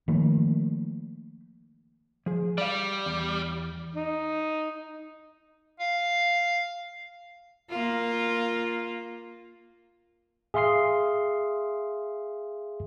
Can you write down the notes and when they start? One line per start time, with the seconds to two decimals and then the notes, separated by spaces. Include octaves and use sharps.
0.08 D#3 F3 A3 A#3
2.26 F3 G#4
2.58 G3 D5 F5
3.06 E2
3.95 D#4
5.80 F5
7.70 A#3 F4
10.54 G#4 E5 F5 C6 D#6 C7